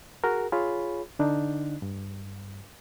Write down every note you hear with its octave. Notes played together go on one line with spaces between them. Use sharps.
F#4 G#4 A#4
F4 G#4 C#5 B5
D3 D4 D#4
G2